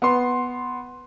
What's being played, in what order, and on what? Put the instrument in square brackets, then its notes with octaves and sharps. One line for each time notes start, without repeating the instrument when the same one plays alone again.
[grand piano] B3 C6